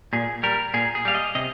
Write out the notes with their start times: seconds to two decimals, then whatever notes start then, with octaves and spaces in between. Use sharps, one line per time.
0.13 A#2 G#4
0.43 G3 A#4
0.74 A#2 G#4
0.95 G#4
1.05 G3 F5
1.15 D#5
1.35 C3 D#5